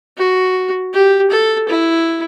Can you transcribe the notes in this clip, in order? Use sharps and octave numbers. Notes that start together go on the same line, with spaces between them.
F#4
G4
A4
E4